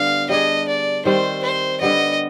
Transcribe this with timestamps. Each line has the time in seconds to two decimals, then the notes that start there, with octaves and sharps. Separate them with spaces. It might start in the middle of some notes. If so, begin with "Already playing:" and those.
Already playing: D3 G3 B3 F5
0.29 G3 D4 G#4 D#5
0.68 D5
1.05 D#3 G3 C4 C5
1.43 C5
1.81 D3 G3 B3 D#5